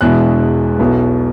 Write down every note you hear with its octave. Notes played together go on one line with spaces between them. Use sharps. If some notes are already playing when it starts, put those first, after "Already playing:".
E1 E2 B2 G#3 E4 F#6
B1 B2 B3 E4